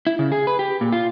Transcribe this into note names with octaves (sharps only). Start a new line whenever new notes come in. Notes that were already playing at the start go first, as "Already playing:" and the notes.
E4
C#3
G#4
B4
G4
A#2
F4